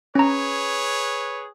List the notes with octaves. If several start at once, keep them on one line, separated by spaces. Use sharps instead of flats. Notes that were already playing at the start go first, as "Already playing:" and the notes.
C#4 G#4 B4 C#5 A#5